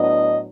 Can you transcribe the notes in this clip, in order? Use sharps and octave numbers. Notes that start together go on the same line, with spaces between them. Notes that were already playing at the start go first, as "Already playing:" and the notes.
Already playing: A2 F#3 B3 D4 D#5